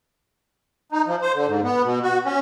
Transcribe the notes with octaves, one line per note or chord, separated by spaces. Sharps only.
D#4
F3
C5
D3
G#2
B3
B2
F#4
C#4